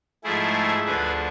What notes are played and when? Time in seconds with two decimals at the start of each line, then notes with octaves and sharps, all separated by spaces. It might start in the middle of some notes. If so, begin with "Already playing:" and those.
0.24 G#2 F3 A3 E4 G#4
0.86 D2 D3 F3 G#4 B4